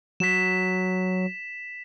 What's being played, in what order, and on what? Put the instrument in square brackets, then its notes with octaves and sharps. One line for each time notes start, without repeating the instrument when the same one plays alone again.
[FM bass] F#3 [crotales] B6 E7